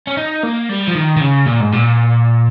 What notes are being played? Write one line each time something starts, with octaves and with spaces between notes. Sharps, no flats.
C#4
D#4
A#3
G3
F3
D#3
D#3
C#3
A#2
G#2
A#2